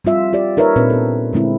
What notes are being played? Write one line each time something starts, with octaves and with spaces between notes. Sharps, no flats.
G3 C4 F4 E5
F4 G4 D5
D#4 A#4 B4 C#5 E5
A#2 C4 D4 B4
B3 A4
D3 G#3 C4 E4